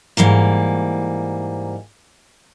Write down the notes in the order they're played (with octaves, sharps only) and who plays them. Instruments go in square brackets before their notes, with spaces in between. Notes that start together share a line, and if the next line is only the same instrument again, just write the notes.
[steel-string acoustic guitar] G#2 E3 G3 A#3